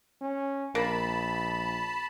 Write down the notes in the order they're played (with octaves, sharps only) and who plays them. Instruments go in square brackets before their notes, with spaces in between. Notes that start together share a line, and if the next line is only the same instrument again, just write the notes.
[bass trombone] C#4
[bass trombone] A#1 [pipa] A#3 [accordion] A5 B5